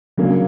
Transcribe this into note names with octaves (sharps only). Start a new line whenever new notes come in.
C#3 F#3 A#3 D4